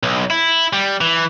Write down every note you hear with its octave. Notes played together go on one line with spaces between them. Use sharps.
B1
E4
G3
E3